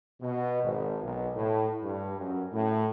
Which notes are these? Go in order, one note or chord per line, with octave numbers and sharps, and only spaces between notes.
B2
G#1
B1
A2
G2
F#2
A2